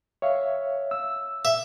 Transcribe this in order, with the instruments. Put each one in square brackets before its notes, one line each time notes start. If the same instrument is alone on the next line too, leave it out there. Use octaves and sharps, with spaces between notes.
[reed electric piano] C#5 E5 F5
E6
[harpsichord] E5